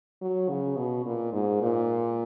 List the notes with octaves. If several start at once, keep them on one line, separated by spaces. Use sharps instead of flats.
F#3
C#3
B2
A#2
G#2
A#2